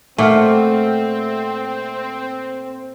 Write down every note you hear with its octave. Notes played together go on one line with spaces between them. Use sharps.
A#2 A3 C4 E5 F#5 F6